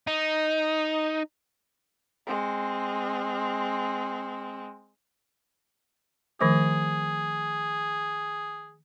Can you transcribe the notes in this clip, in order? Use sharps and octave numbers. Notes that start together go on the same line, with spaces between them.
D#4
G#3 C4
D#3 F3 A3 G#4